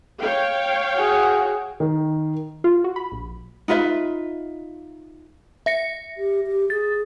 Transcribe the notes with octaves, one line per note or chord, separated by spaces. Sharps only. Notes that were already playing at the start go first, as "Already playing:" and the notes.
C#5 F5 G5
F#4 G#4
D#3
F4
F#4
B5
A#1
D#4 F4 B4 E5
E5 A#6 C#7
G4
G4
G#4 A6